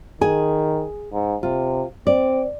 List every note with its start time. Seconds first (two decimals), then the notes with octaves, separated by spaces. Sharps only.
0.21 D#3 G#4 G#5
1.12 G#2
1.43 C3 F4
2.07 C4 D5